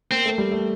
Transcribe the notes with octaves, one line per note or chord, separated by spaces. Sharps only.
A#3 C4
A3
G3
A3